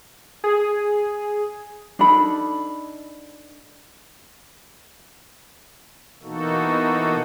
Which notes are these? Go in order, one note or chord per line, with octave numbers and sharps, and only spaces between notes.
G#4
D4 D#4 A4 B5
B2 E3 A#3 D#4 F#4 A4